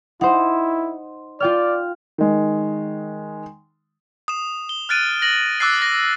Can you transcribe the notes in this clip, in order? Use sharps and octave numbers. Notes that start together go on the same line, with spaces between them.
D#4 E4 C5 F#5
F4 D5 G5 F6
D#3 G#3
D#6 E7
G7
F6 F#6 A6 D7 D#7
A#6 F#7
D6 E6 F#6 A6 C7
A#6